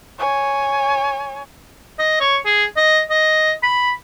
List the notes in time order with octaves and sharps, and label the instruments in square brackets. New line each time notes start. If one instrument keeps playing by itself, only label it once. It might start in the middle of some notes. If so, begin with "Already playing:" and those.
[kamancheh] C#5 G#5
[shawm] D#5
C#5
G#4
D#5
D#5
B5